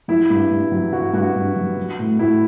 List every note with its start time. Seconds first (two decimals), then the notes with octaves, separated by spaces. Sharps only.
0.08 F#3 E4
0.30 G2
0.50 G2
0.72 F#3
0.93 F#3 F#4
1.13 G2 F#4
1.35 G2
1.56 F#3
1.76 F#3
1.99 A2
2.19 A2 E4